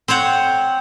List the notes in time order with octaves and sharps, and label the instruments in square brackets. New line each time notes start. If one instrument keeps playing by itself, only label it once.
[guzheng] C4 C5 C#5 F#5